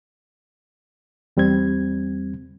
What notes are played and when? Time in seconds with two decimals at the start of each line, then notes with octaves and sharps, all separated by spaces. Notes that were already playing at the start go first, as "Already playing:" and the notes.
1.37 E2 G3 C4 G#6